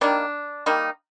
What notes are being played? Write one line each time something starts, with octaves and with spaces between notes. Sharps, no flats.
D#3 G3 A#3 D4
D#3 G3 A#3 D#4